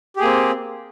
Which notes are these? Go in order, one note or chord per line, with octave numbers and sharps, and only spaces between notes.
A#3 C4 G4 G#4